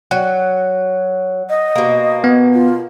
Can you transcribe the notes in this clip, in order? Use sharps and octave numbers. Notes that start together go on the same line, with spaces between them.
F#3 F#5
D#5
B2 A#3
B3
F4